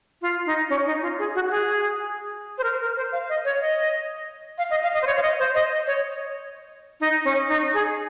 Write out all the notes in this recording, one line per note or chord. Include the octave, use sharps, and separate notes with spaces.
F4
D#4
C#4
D#4
F4
G#4
F#4
F#4
G#4
C5
A#4
A#4
C5
F5
D#5
C#5
D#5
F5
D#5
F5
D#5
C5
C#5
F5
D#5
C5
D#5
D#5
C#5
D#4
C#4
D#4
G#4